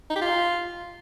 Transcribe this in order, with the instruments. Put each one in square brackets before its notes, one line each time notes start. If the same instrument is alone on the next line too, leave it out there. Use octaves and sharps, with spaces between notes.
[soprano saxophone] D#4
G4
F4